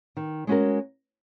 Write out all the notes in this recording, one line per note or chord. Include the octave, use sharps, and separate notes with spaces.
D#3
G#3 C#4 F#4 A#4